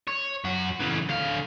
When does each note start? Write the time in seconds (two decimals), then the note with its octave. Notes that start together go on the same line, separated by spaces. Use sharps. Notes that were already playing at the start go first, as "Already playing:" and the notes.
0.08 C#5
0.44 F#2 F#4
0.80 C#3 E3
1.09 D3 F5